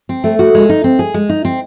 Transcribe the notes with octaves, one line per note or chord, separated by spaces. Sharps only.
C4
A3
F#4
G#3
D#4
C4
G#4
G#3
D#4
C4